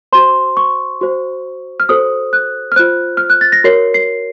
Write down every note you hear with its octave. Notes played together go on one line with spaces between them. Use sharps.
F#4 C5 C6
C#6
F#4 C5
F6
F#4 A4 C5 D#6
F#6
F6
F4 C5 F#6
F6
F#6
A6
A#6
F#4 A#4 C#5 C7
C7